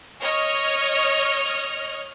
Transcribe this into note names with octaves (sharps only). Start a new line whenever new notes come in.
C#5 D#5 F6